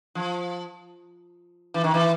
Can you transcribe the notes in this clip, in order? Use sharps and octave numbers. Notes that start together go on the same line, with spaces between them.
F3
E3
D#3
E3